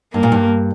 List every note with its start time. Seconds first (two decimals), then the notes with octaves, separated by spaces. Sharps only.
0.14 G2 A#3
0.23 A#2
0.32 G2